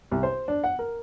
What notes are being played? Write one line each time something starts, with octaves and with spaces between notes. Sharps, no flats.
C2
C5
D4
F#5
A#4